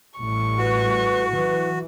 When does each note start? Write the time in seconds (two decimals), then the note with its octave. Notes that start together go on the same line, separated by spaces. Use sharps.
0.19 A1 A2 G3 C#6
0.57 F#4 B4
1.34 E3 F#3 B4